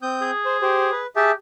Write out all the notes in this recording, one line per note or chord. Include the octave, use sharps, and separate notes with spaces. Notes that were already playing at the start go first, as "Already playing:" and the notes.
C4 D#6 G6
G#4
C5
G4 C5
B4
G4 G#4 E5 A5